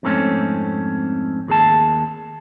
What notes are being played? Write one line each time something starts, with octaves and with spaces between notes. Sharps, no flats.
F2 G#2 A3 C4 C#4
D#2 G#4 A5